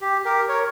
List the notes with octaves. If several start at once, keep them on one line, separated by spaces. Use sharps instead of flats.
G4
G4 A#4
A#4 C#5